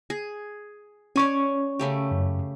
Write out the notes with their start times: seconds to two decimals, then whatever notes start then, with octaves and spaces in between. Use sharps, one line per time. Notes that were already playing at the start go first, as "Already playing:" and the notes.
0.10 G#4
1.16 C#4 C#5 D5 G#5 C#6
1.79 C#3 A3 G4
2.11 F#2